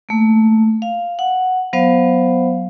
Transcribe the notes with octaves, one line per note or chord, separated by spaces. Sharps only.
A3 A#3
F5
F#5
F#3 B3 C5 F5